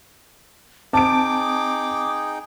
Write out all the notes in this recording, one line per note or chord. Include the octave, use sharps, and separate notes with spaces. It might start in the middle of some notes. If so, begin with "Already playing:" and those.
C4 D#4 G#4 G5 A5 D6 D7